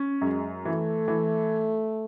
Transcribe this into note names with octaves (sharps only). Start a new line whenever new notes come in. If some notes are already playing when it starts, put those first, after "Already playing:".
Already playing: C#4
F#2 G#3
E3 A3
E3